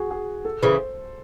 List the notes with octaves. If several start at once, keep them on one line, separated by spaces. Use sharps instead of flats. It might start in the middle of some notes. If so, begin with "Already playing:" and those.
Already playing: F#4 G#4 F#5
G#4
A4
C#3 E3 C5